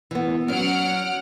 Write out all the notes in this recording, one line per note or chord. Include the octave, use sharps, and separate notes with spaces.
E3 B3
F#3 C#4 F#5 F6 D7